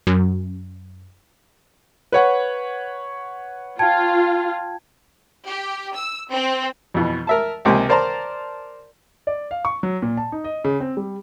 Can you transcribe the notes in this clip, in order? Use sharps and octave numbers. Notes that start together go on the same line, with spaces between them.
F#2
B4 C#5 F#5
F4 G5 A5 G#6
G4
E6
C4
F2 B2 E3
A#4 E5 A5
C#2 C3 A#3 C4 G#5
A#4 C5 D5 A5 A#5 C6
D5
F5
C#6
F#3
A#2
A5
D#4
D#5
C#3
C4
G3